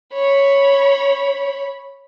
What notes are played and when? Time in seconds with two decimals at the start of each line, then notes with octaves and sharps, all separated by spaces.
0.13 C#5 B5